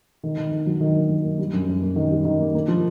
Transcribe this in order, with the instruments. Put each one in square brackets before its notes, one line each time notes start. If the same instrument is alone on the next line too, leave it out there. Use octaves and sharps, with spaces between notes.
[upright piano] D#3
D#3
D#3
F#3
D#3
A#3
F#3
A#3
G3
F#2
F#2
A#3
D#3
G3
D#3
A#3
A#3
F3